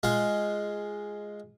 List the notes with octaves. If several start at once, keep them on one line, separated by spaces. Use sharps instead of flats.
G#3 F4